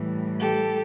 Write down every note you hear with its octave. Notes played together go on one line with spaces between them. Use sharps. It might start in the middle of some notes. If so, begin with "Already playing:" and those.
Already playing: A2 E3 G3
G4 A4